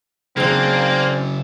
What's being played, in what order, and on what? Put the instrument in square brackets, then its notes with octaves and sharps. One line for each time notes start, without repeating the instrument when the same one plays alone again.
[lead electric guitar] C#3 F#3 [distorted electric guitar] A#3 [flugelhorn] C4 [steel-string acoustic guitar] D4 G#4